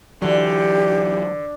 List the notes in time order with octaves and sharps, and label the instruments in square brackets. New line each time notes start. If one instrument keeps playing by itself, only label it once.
[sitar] D3 [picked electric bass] E3 F#3 [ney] G4